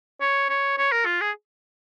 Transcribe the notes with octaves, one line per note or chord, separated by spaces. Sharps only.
C#5
C#5
C#5
A#4
F4
G#4